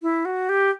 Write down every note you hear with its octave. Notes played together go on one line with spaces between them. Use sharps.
E4
F#4
G4